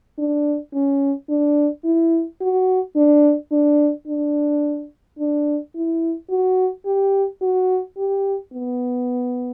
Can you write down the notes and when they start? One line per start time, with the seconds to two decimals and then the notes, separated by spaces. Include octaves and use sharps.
0.18 D4
0.73 C#4
1.29 D4
1.84 E4
2.41 F#4
2.96 D4
3.52 D4
4.07 D4
5.19 D4
5.75 E4
6.30 F#4
6.86 G4
7.41 F#4
7.97 G4
8.53 B3